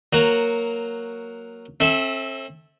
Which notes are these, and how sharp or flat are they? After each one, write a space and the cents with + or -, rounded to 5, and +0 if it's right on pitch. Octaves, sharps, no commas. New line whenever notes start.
F#3 +0 A#3 +0 F#4 +0
C4 +40 A4 +0 E5 -15